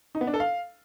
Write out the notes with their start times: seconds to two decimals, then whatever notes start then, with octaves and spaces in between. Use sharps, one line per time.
0.15 D#4
0.21 B3
0.27 D4
0.34 A4
0.40 F5